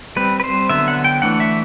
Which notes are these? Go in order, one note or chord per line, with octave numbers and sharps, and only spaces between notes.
G3 C4 B4
B4
C5
D3 F#3 B3 E5
F#5
G5
E3 A3 D4 F#5
E5